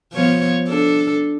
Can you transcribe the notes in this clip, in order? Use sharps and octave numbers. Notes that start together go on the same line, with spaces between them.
F3 B3 C#5
D4 A4